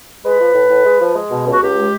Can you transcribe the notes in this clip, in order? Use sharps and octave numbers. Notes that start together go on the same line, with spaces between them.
G#3 B4
F3
A2
A2
G#3
F3
G#3
B2
C#2
F#4
C#2 G4
G#3